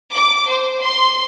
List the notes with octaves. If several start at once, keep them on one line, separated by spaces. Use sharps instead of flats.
D6
C5
C6